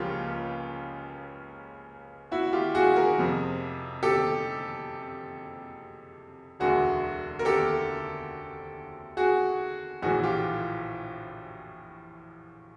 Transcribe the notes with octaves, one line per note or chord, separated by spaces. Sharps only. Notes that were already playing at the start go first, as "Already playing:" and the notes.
Already playing: C#2 C#3 F3 A#3 F4 G4
E4 F#4
F4 G4
F#4 G#4
G#4 A#4
F2 C3 F3
G4 A4
E1 D2 D3 F#4 G#4
A#4
G4 A4
F#4 G#4
A#1 A2 E3 F#4 G#4
F4 G4